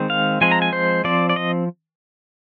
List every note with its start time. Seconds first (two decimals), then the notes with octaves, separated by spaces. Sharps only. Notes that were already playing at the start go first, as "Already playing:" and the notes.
Already playing: D#3 G#3 C4
0.10 F5
0.41 F3 G#3 C4 G#5
0.51 A#5
0.62 G#5
0.73 C5
1.04 F3 C4 D5
1.30 D5
1.36 D#5